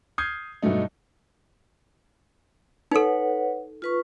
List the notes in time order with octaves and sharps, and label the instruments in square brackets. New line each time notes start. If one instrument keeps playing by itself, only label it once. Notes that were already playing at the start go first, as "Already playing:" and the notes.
[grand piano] D#6 F6 G6 G#6 C7
G2 B2 F#3 A3 D#4
[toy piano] D#4 A4 [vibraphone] B4 C#5 F#5
[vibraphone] F4 B4 C#6